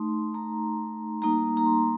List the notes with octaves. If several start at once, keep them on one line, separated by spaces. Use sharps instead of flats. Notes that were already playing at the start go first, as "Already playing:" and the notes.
Already playing: A3 D#4 C6
A#5
G3 A#3 D#4 A#5
A#5
C6